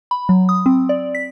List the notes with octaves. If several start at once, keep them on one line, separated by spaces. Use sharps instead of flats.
B5
F#3
D#6
C4
D5
B6